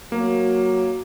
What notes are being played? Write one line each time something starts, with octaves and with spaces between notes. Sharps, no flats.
F#3 A#3